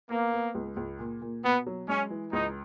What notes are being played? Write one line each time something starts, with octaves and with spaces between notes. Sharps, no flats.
A#3 B3
B3
C#2
C#2
A#2
A#2
B2 B3
F#3
G#3 C#4
E3
C#2 D#4